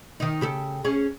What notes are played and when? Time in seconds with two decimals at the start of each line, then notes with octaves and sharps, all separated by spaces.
0.20 D#3 D#4
0.41 C#3 G4 A4
0.85 C#4 G#4